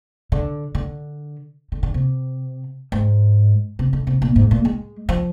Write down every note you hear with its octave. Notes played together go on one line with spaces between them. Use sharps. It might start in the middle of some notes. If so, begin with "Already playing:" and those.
D3
D3
D3
D3
C3
G#2
C3
D3
C3
A#2
G#2
A#2
G#3
F3